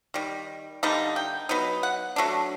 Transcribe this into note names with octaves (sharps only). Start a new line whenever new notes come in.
D#3 G3
D3 G3 A#3 D#4
G5
F#3 B3 D#4
F#5
F#3 A3 D4